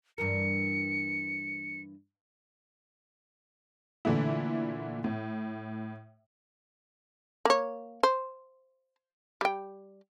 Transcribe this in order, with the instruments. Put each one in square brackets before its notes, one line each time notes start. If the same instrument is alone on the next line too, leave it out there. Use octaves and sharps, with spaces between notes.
[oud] G2 E3 A#4 [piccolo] C#7
[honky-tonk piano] A#2 D3 E3 A3 E4
A2
[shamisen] A#3 C#5
C5
G3 G5